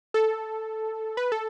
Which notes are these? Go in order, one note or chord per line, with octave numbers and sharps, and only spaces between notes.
A4
B4
A4